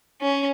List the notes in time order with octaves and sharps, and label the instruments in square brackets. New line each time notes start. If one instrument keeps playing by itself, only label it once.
[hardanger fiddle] C#4